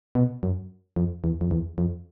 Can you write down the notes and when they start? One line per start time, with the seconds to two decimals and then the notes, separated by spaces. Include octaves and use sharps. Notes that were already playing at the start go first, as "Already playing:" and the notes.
0.15 B2
0.43 F#2
0.96 F2
1.24 E2
1.41 F2
1.51 E2
1.78 F2